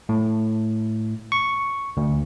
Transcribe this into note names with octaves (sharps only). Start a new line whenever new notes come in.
A2
C#6
D2